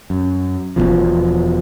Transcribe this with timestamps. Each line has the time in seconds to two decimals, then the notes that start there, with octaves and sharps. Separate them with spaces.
0.10 F#2
0.76 E1 C2 B2 F3